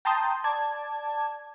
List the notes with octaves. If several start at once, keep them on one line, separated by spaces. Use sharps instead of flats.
G5 A5 A#5 C6 D#6 G6
D5 A5 G#6